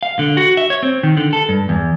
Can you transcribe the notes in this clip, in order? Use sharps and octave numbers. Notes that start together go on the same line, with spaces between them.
F5
D3
F#4
E5
C#5
C4
D#3
D3
A4
G2
E2